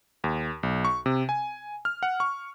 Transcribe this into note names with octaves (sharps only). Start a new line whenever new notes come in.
D#2
B1
C#6
C3
G#5
F6
F#5
C#6